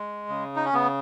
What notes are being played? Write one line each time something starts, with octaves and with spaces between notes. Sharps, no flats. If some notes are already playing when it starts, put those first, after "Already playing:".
Already playing: G#3
C#3
D#4
C#4
C#3 B3